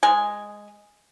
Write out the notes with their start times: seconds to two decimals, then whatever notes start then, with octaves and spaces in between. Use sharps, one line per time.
0.03 G#3 G#5